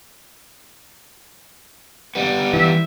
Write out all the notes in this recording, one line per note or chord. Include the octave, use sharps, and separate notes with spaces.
G3 B3
E3 E5